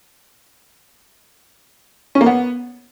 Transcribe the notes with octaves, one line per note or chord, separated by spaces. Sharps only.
C#4
A#3
B3